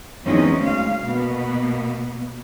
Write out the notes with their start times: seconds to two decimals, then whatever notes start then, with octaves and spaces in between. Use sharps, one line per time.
0.25 E2 F#3 G#3 C4 C#4 D#4
0.61 D2 F5
1.06 B2 A#3 B3